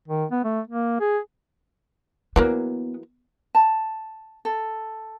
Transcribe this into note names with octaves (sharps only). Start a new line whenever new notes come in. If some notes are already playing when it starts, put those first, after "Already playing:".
D#3
B3
A3
A#3
G#4
E3 F#3 A#3 B3
A5
A4